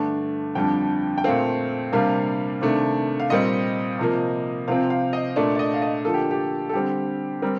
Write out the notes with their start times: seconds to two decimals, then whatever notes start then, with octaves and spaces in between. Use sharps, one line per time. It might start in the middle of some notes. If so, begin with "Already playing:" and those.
Already playing: G2 D3 A3 D4
0.55 F2 D3 G3 D4 G5
1.18 G5
1.24 A#2 A3 C4 F5
1.93 C3 G3 A#3 D4 F5
2.61 C3 D#3 A3 D4
3.20 F5
3.30 A#2 G3 C4 D#5
3.99 C3 F3 A#3
4.68 C3 F3 C4 F5
4.90 F5
5.13 D#5
5.36 A#2 A3 D4 D5
5.55 D5
5.59 D#5
5.74 F5
5.82 D#5
6.05 D3 F3 A#3 A4
6.14 G4
6.31 G4
6.69 A4
6.73 D3 G3 C4 G4
7.42 G3 C4 A#4